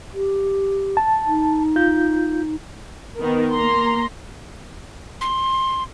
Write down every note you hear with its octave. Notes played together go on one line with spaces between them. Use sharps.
G4
A5
D#4
F4 G6
D#3 B3 A#4
A#3 A#5 C6
C6